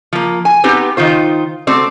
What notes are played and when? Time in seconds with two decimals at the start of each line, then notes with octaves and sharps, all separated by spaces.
0.13 F3 A#3
0.45 G#5
0.64 B3 C4 D#4 G4 B4
0.97 D#3 D#4 F4 C5
1.67 A3 C4 F#4 D5